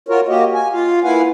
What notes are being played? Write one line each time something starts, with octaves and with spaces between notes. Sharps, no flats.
F4 F#4 A#4 C#5
A#3 F#4 G4 D#5
G#5
F4 F5
A#3 E4 B4 F5 F#5 G#5